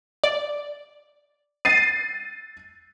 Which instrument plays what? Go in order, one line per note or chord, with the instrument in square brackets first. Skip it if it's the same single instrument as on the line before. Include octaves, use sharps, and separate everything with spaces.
[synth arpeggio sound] D5
[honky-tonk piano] A6 C7 D#7